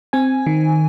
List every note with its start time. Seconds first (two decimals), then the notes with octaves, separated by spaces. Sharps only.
0.13 C4 G#5
0.46 D#3